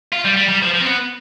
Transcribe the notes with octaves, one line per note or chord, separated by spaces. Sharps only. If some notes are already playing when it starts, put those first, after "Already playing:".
F4
G3
G3
G3
F3
F3
C4
B3